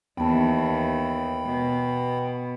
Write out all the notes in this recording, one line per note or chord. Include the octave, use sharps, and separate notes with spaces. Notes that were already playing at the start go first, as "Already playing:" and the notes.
D#2 E3 B3 G5 A5 B5
B2